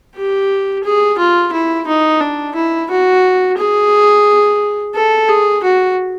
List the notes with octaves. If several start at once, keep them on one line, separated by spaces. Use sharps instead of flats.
G4
G#4
F4
E4
D#4
D4
E4
F#4
G#4
A4
G#4
F#4